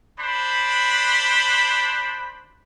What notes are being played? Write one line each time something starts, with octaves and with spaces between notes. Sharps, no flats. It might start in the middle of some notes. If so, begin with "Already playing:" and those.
D4 C5 B5